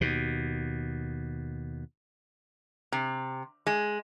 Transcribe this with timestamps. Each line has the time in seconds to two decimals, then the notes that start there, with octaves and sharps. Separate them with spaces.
0.01 D#2 B2
2.92 C3
3.67 G#3